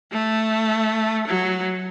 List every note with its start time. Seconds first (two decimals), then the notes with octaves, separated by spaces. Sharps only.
0.12 A3
1.28 F#3